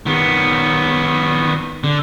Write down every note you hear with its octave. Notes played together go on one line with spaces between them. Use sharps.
D#3 B3
D3